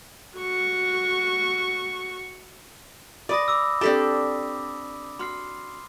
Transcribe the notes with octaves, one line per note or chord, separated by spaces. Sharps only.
F#4 C#6
B4 D5 D6 D#6 A#6
B5 D6 E6
C4 D4 G4 A4 D5 A6 B6
F#4 C6 F6 C7